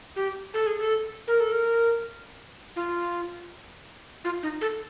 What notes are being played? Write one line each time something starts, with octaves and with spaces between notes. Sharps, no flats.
G4
A4
G#4
A4
A#4
A4
A#4
F4
F4
D#4
A4